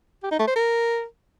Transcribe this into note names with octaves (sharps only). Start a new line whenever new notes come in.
G4
D#4
A3
C5
A#4